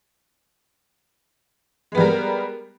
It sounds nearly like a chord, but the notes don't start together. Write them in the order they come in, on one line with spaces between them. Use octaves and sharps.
G#3 B3 G3 A#4